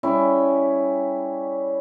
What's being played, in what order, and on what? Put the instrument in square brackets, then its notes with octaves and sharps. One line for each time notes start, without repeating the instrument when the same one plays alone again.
[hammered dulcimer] G3 C#4 E4 G#4